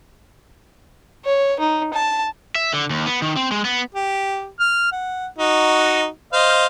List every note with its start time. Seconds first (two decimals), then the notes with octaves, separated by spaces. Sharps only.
1.25 C#5
1.59 D#4
1.93 A5
2.55 E5
2.73 D3
2.90 D#2
3.06 B3
3.22 D#3
3.37 C4
3.51 G#3
3.65 B3
3.95 G4
4.60 F6
4.92 F#5
5.38 D#4 F#4
6.33 C5 D#5 F5